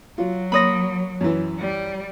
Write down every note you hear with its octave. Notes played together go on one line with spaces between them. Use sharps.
F#3 F4 F#4
A#3 C#5 B5 C6 D#6 A#6
F#2 E3
G3